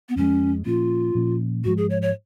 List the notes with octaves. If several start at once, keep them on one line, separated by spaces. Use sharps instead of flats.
B3
F2 F3 G#3 C#4
A#2 F3 A#3 C#4 F4
A#2 F3 A#3 C#4
G#2 F3 G#3 F#4
G#4
C#5
C#5